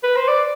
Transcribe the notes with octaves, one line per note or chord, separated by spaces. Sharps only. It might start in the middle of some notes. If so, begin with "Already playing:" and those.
B4
C5
D5